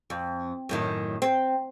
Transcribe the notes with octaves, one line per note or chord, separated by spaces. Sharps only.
F2
F#2 A2 D#3
C4